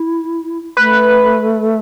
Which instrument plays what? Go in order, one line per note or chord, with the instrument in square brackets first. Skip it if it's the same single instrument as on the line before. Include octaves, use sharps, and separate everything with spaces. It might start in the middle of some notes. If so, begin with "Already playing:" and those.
Already playing: [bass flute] E4
[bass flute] A3 [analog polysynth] B4